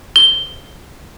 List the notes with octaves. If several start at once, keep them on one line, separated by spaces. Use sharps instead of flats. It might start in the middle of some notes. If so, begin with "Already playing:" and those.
G7